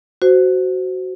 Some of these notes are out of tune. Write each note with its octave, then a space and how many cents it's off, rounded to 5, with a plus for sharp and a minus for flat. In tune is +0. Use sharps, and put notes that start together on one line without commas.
F#4 +10 C5 -15